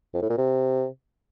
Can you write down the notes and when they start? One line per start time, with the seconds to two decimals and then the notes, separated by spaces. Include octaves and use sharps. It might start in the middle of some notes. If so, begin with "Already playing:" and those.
0.14 F2
0.22 A2
0.30 A#2
0.38 C3